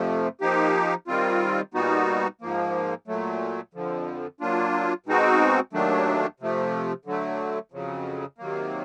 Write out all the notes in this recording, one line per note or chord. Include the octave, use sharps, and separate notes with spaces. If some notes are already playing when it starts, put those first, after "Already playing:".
Already playing: F2 C3 F3 A3
F3 A#3 D#4 G4
D#3 G3 C4 F4
A#2 G3 B3 D#4 F#4
G#2 F3 A#3
A#2 F#3 A3
F2 D3 F3
F#3 A#3 D4 F4
B2 G#3 C4 D#4 F#4
D#2 D#3 F#3 A3 D4
C3 F3 A3
D3 F#3 A3
F2 C#3 F#3
C3 D#3 F#3 A#3